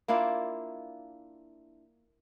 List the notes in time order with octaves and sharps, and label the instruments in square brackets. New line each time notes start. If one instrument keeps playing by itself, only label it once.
[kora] A#3 D4 E4 F4